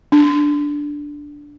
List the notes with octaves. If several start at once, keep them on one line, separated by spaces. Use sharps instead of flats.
D4